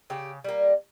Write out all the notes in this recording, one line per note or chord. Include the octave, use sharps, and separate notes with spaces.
C#3 G4
G3 A#3